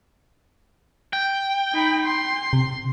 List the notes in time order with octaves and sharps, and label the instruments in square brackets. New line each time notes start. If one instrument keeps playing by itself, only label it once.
[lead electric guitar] G5
[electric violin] D#4 B5
C6
[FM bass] C3